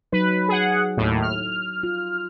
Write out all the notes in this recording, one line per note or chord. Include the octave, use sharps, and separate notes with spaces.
F#3 D#4 B4
G#4 F#5
D#2 A2
F6
F4